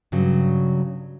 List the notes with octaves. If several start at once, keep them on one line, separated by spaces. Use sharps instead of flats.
G2 C#3 F#3